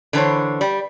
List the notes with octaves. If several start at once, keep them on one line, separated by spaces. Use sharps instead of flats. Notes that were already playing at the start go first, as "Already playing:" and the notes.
D3 E3 D4 G#4 C5 C#5
G3